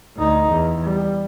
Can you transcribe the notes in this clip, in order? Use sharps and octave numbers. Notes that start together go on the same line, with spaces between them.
D2 D#4
E2
G3